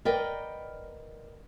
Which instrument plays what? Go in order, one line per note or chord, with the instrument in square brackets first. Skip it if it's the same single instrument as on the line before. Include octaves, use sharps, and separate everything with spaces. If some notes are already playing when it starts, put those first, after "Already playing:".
[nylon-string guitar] A#4 B4 D5 D#5 F#5 G5